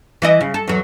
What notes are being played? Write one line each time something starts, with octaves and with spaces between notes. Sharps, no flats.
E3 E4 D#5
C#3
A4
E2 F#3